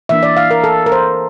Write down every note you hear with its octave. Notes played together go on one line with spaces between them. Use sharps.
E3 A#3 D4 E5
D5
F5
A#4
A4
A#4
C5